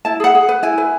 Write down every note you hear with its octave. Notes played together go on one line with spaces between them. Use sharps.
E4 A5
G#4 F#5
G#4
B4
E4 G#5
B4